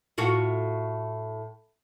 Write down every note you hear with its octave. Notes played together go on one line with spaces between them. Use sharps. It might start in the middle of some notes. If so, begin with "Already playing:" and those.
A2 F4 F#4